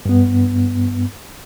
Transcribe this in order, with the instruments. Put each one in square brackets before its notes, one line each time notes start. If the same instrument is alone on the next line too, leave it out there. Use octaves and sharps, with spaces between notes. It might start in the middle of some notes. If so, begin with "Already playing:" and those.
[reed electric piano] G2 B3